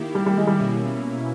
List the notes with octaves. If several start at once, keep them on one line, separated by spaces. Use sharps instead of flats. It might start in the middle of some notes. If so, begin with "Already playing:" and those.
Already playing: D#3 A#3 E4 G4
G3
G3
G#3
G3
B2 A#3 C#4 E4